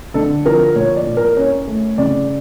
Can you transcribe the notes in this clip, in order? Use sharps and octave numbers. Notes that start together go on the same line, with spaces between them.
D3 A4
F3 A#4
A#2 C#5
D5
A#2
A#4
C#4 C#5
A3
C#3 D5